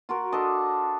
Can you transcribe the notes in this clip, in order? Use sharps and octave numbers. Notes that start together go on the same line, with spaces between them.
F4 F#4 A#4
D4 A4 D#5